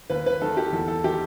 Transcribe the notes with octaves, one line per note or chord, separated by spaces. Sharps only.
D#2 B4
B4
D#3 A4
G4
E2 A4
A4
D#3 G4